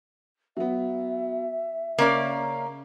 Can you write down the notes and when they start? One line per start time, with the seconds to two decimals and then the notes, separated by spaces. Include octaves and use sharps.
0.57 F#3 B3 E5
1.99 C#3 A#3 C#4 D5